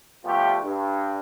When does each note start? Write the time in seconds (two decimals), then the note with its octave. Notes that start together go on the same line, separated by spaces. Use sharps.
0.25 F3 G3 A3 B3 F4 G4
0.63 G2